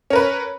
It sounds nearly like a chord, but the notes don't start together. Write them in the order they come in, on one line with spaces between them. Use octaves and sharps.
C#4 A#4 B4